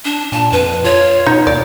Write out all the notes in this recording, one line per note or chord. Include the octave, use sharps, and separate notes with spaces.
D4
A#2 A5
F2 B4
F4 C#5
B2 D#4
D#2 D5